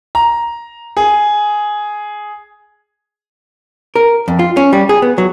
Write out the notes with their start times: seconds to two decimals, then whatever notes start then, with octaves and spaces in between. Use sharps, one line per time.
0.15 A#5
0.97 G#4
3.96 A#4
4.28 F2
4.39 F4
4.57 C#4
4.73 G3
4.89 G#4
5.02 B3
5.18 F#3